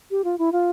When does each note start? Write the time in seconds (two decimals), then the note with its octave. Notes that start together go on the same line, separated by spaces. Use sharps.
0.11 G4
0.24 F4
0.39 E4
0.52 F4